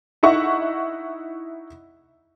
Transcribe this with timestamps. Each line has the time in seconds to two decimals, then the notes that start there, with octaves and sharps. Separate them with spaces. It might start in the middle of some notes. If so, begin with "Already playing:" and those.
0.23 D#4 E4 E5 F#5 C#6